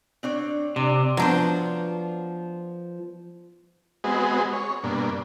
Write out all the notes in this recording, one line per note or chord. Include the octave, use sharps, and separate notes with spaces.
C4 D4 C#5
C3 D4
F3 F#3 B3 D4 C5
G#3 B3 C4 F#4 G#4 D#5
C#5
G2 B2 A#3 D4